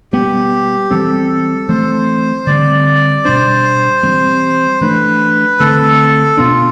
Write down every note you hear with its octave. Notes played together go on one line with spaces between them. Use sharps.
B2 G3 B3 G4
E3 G3 C4 A4
E3 A3 C4 C5
D3 G3 C4 D5
B2 G3 D4 C5
E3 G3 C4
E3 A3 D4 B4
D3 A3 C4 A4
B2 B3 D4 F4